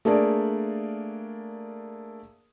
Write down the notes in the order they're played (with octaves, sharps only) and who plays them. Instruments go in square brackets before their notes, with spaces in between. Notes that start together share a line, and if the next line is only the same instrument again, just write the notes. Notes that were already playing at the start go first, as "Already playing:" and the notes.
[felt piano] A3 A#3 D4 G#4 A#4 D5